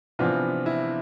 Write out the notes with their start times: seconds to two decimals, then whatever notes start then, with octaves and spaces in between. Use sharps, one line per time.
0.19 C3 E3 F3 B3 D4 F4
0.66 E4